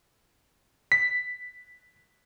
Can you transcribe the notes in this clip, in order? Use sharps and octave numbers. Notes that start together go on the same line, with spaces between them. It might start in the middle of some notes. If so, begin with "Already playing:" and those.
B6